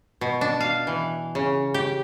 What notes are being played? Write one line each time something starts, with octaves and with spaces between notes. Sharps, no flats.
B2
D4
F5
E3
C#3
G4